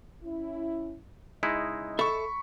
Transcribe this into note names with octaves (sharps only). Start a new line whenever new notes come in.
C#4 E4
C#3 G#3 D#4 E4 D#5
A4 E5 B5 C#6